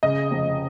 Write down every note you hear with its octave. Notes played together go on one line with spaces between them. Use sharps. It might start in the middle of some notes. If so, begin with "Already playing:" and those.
C#3 D#5
F1